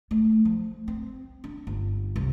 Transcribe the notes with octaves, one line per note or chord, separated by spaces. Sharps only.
A3
F3
C4
D4
G1
C2